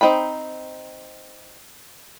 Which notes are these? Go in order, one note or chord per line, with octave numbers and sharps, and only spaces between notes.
C4 D#4 G5 B5